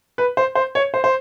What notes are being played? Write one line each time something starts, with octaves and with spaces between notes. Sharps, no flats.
B4
C5
C5
C#5
C5
C5